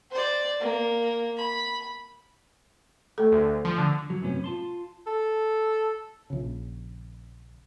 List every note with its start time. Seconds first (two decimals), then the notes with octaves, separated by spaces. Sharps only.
0.11 C5 D5
0.60 A#3
1.37 B5
3.18 A3 A4
3.32 D2
3.65 F3
3.78 D3
4.10 F#3
4.22 F#2 A2 C3 B3 C#4
4.44 F4 A5 C6
5.07 A4
6.30 A#1 C#3